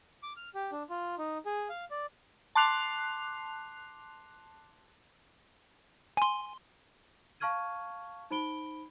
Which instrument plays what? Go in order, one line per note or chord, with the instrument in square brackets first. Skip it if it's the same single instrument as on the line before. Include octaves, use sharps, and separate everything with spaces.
[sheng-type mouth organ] D6
F6
G4
D4
F4
D#4
G#4
F5
D5
[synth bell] A5 C6 D6 F#6 C7 F7
[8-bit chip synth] G#5 C6
[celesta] F5 A5 C#6 F6 G#6 D#7
D#4 C5 B5 D7 G7